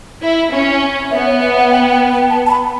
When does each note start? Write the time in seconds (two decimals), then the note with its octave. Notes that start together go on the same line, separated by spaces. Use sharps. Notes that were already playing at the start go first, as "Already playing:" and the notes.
0.22 E4
0.52 C#4
1.11 B3 E5
1.26 C#5
1.41 E5
1.57 F#5
1.71 G5
1.91 G5
2.11 G5
2.30 A5
2.46 A5
2.51 B5